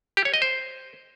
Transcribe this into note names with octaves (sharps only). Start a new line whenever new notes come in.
G4
C#5
D#5
C5